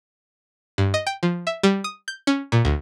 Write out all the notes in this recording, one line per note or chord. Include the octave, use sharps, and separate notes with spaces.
G2
D#5
G5
F3
E5
G3
D#6
G6
C#4
A#2
D2